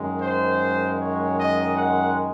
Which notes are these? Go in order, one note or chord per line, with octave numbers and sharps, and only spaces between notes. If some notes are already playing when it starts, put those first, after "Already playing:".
Already playing: F#2 D#3 G#3
C5
C#5
D#5
F#5